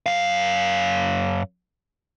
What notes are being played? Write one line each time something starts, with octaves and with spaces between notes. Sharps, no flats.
F#2 F5